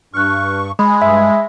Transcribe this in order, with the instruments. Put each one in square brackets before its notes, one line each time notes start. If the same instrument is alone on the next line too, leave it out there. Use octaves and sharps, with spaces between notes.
[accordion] G2 C#6 [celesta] F6 F#6
[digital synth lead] G#3 [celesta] B5
[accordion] G2 [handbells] E5